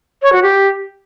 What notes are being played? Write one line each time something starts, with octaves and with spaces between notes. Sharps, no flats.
C#5
F#4
G4